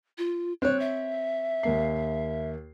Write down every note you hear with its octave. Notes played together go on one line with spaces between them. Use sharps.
F4
C4 C#5 F#6
E5
D#2 A#3 C7